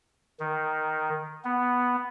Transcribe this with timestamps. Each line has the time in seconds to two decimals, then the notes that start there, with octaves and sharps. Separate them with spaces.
0.40 D#3
1.45 B3